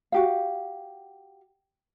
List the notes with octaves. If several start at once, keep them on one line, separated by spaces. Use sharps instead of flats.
F#4 G4 F5